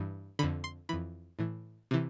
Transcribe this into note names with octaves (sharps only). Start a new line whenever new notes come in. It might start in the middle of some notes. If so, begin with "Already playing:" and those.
Already playing: G2 E3
F2 D3 B5
C6
F2 E3 B5
A2 E3
C3 E3